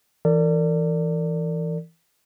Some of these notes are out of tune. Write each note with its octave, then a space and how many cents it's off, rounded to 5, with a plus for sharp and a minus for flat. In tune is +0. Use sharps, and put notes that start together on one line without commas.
E3 -5 A#4 -45 D5 +0